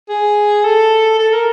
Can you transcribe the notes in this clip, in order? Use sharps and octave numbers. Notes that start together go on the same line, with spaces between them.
G#4
A4
A4
A#4